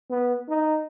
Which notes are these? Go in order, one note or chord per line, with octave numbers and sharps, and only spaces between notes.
B3
D#4